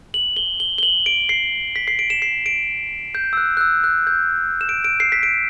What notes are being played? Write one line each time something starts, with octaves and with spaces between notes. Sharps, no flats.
F#7
G7
G7
G7
F#7
D7
C7
B6
C7
D7
E7
C7
D7
G6
E6
F#6
F#6
E6
F#6
G6
E7
D7
D7
C7
B6
D7